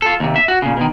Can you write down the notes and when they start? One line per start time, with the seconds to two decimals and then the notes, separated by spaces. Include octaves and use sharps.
0.02 F4 A4
0.20 D#2 C3
0.36 E5
0.48 F#4
0.62 A#2 C#3
0.77 B2 D#3